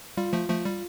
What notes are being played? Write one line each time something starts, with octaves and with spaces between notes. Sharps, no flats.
G3 F4
F3 A3
F3 A3
G3